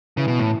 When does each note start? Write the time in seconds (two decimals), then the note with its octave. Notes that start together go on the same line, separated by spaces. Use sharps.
0.17 C#3 E3
0.28 B2
0.39 A2